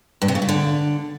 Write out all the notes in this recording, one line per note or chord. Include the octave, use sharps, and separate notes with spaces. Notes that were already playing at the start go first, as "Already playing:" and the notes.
G2
C3
C#3
A#2
D3